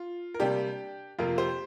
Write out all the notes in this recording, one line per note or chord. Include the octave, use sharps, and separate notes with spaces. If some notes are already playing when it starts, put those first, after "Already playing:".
Already playing: F4
A#4
C3 G3 A#3 D4 G4
F2 C3 A#3 F4 A#4
G4 C5